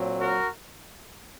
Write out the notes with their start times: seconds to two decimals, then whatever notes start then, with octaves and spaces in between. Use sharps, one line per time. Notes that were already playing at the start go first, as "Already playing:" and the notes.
Already playing: A#2 F#3 C4
0.18 F#4 A#4